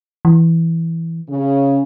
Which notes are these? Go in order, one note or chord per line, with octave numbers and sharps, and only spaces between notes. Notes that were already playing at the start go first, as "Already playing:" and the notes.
E3
C#3